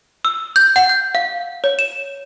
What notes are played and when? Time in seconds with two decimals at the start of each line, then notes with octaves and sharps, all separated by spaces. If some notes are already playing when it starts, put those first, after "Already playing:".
0.25 E6
0.56 G6
0.76 F#5
0.89 G6
1.15 F5
1.64 C#5
1.79 E7